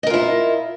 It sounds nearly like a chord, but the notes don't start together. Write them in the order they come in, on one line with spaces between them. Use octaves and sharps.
D#5 A#4 F4 E4